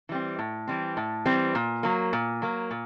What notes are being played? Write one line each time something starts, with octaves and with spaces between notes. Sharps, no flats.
E3 G3 C4
A2
E3 G3 C4
A2
E3 G3 C4
A#2
F#3 A#3
A#2
F#3 A#3
A#2